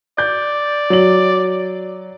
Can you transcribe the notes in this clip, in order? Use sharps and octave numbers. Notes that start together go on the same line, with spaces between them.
D5 G6
F#3 F#7